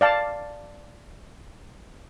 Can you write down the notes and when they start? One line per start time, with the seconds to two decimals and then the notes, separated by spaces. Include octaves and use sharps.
0.01 D5 F5 A5